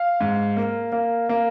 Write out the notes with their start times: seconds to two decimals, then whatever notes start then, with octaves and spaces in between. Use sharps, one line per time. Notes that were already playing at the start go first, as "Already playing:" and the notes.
Already playing: F5
0.21 G#2
0.57 A#3
0.92 A#3
1.29 A#3